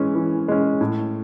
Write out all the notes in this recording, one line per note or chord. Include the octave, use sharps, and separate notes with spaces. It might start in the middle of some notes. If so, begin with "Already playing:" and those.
Already playing: E3 G#3 C#4
E3
G#3 C#4
A2